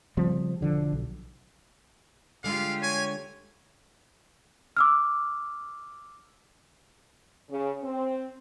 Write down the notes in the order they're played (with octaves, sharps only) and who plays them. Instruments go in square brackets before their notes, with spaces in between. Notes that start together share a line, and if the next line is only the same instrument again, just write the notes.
[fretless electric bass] C#3 F3 G3 C4
E1 D3 F3
B1
[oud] D3 G#3 [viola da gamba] F4 G4 [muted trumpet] F5
[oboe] C#5 [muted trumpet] G#5
[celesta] D6 E6 F6
[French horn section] C#3
C4